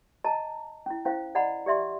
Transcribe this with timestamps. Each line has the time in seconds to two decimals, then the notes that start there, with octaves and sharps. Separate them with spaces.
0.24 D#5 A5 A#5
0.86 C#4 E4
1.05 C#4 E4 C5 F5
1.35 D5 D#5 F#5 A#5 B5
1.66 G4 D5 E5 C6